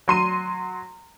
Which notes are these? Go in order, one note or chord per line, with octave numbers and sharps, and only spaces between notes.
F#3 C6 D#7